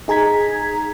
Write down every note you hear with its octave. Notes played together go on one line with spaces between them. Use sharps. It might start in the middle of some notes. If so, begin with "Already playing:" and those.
D#4 G#4 A#5 G#6 B6